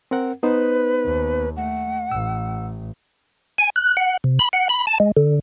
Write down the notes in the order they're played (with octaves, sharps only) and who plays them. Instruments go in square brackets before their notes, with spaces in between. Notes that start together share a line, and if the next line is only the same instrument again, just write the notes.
[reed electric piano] C4 A#4 F#5
[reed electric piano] B3 D#4 C5 [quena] B4
[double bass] D#2
[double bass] A3 [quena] F#5
[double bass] A1 [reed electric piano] E6
[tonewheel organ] G#5
F#6
F#5
C3
B5
F#5
B5
A5
G#3
D3